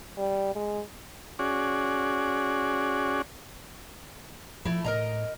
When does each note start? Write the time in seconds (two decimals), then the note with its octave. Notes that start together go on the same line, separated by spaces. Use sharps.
0.18 G3
0.55 G#3
1.39 C#4 F#4 G#4 D5
4.65 F3 A3 E4
4.84 A2 A#4 D#5 A#5